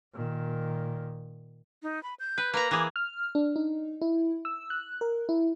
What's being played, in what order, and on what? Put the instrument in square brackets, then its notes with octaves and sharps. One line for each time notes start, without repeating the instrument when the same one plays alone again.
[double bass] A#2 D#3
[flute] D#4
B5
G6
[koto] B4
[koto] A#3 A#5 [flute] B4
[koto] E3 G#4 [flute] D6
[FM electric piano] F6
D4
D#4
E4
E6
F#6
A#4
E4